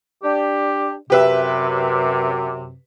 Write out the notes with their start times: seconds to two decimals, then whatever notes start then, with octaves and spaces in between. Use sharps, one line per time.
0.23 D4 G4
1.10 F#2 C3 G4 B4 E5